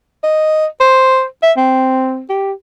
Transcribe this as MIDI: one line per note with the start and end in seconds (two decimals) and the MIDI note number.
0.23 0.66 75
0.80 1.24 72
1.43 1.52 76
1.57 2.23 60
2.29 2.52 67